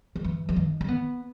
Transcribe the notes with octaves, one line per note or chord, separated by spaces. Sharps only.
D#3
E3
E3
D#3
C#4
B3